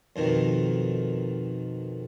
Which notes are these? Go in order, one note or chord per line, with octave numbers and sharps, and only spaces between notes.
F2 B2 D#3